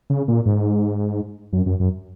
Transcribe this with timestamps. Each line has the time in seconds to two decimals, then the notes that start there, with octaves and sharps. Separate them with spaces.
0.10 C#3
0.28 A#2
0.46 G#2
1.53 F#2
1.66 F#2
1.80 F#2